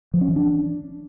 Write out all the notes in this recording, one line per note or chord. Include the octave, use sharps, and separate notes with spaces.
F3
C#4
E3
D4